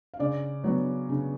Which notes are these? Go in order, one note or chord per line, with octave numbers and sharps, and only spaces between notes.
F5
C#3 D5
F#3 B3
C#3